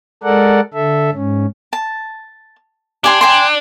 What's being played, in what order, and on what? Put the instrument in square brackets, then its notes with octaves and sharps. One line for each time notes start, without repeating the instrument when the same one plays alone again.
[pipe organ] G#3 A4 A#4 D5 F#5
D3 A4 E5
G#2 C#4
[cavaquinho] A5
[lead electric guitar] D4 [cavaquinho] G4 G#5 C6
[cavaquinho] G5 G#5 C6